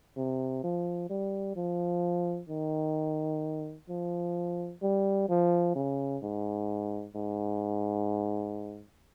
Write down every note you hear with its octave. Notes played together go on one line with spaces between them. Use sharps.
C3
F3
G3
F3
D#3
F3
G3
F3
C#3
G#2
G#2